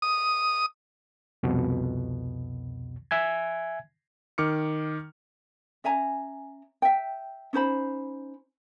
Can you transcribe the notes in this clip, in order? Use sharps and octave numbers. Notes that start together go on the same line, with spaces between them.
D#6
C2 F2 B2
E5 G#5 G#6
D#3 D6 F6 C#7
C#4 E5 G#5 A#5
E5 G5
C#4 D#4 C5 B5